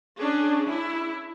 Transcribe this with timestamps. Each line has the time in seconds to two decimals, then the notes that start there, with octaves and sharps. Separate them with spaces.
0.18 C#4 D4 G#4
0.69 E4